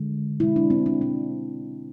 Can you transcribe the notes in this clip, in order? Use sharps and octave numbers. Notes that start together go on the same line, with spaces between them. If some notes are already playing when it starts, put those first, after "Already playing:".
Already playing: D3 G#3
B2 G#3 E4
D4
C4
D4
B2 G#3 D4